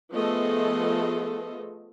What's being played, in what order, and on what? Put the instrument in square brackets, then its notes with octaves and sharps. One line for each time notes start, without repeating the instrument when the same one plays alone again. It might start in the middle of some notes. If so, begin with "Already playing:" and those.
[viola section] F3 A3 B3 G#4 A4 D#5